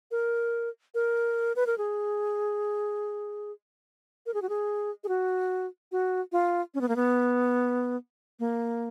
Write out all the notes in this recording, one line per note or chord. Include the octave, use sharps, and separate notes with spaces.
A#4
A#4
B4
A#4
G#4
A#4
G#4
F#4
G#4
G#4
F#4
F#4
F4
C#4
B3
A#3
B3
A#3